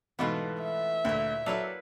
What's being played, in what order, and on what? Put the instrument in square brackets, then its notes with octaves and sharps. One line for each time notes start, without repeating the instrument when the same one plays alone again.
[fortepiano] G#2 B2 B3 [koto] E3 A3 F4
[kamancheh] E5
[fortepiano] D2 [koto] A#2 E4
[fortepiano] F#3 A4 D5 [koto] E4 B4 F5